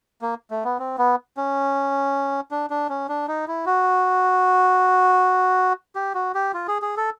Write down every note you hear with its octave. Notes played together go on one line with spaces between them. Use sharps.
A#3
A3
B3
C4
B3
C#4
D4
D4
C#4
D4
D#4
E4
F#4
G4
F#4
G4
F4
G#4
G#4
A4